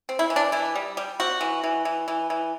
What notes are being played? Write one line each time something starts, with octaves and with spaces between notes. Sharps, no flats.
C4
E4
E3
D4
E3 E4
G3
G3
C4 F#4
E3
E3
E3
E3
E3